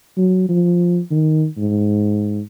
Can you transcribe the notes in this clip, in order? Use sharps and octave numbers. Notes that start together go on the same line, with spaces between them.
F#3
F3
D#3
G#2